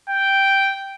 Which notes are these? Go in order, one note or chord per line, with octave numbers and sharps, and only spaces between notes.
G5